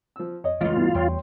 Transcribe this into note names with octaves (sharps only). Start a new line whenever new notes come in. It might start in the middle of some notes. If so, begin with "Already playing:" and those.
F3 E6
F2 C#5 D#5
C#2 E3 A3 F4
D2 G2 B2 G3 B3 E4
E2 C#5 G5 C6